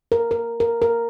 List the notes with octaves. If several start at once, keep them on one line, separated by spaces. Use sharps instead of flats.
A#4
A#4
A#4
A#4